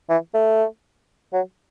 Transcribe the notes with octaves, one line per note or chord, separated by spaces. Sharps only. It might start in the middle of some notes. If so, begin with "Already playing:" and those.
E3
A3
F#3